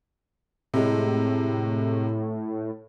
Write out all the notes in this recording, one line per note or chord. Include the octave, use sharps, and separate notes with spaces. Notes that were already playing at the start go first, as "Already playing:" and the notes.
A2 C3 G#3